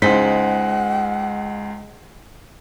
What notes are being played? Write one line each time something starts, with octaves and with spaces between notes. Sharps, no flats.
C#2 G#3 D#4 C5 F#5 B6